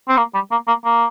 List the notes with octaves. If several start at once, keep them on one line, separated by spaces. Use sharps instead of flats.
C4
A#3
G3
A#3
A#3
A#3